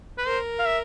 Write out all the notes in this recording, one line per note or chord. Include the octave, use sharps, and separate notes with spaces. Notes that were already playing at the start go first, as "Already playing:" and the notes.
B4
A#4 C5
F5
E5